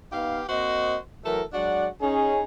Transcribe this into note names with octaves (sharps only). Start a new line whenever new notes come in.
B3 D#4 G4 F5
A#3 C4 F#4 C5 D#5
E3 F#3 A3 A4 A#4
F#3 G#3 D4 F#4 D5 F#5
C#4 D#4 G#4